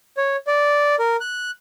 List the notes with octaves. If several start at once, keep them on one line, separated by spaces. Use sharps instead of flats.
C#5
D5
A#4
F#6